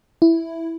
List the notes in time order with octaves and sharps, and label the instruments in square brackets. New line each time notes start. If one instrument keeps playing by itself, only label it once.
[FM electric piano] E4